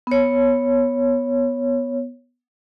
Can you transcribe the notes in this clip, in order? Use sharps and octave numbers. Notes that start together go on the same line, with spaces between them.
B3 C#5